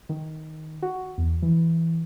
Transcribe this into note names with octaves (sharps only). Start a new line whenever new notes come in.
D#3
F#4
E2
E3